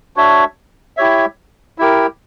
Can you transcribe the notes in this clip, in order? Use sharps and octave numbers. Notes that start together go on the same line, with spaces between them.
D4 F#4 C#5 E5
E4 G4 C#5 E5
E4 G4 A#4